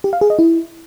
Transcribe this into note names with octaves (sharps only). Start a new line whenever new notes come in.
G4
F5
G#4
D#5
E4